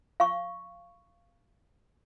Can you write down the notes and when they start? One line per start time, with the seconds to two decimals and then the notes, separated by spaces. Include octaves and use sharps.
0.20 F5 C#6